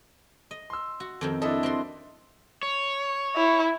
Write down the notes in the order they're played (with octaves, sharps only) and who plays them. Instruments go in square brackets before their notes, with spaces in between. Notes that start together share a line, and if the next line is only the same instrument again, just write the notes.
[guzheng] D#5
[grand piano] C6 E6
[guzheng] F#4
F2 D#3 C4
[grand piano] D4 E4 D#5 [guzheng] A4
[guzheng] C4 F#4 C6
[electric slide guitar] C#5
[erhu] E4